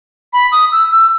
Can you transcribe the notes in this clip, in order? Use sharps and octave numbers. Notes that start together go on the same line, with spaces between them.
B5
D#6
E6
E6